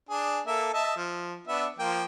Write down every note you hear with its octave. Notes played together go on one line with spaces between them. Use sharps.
D4 G#4
A#3 A4 E5
D#5 E5 A5
F3
B3 D4 E5
F3 A#3 G5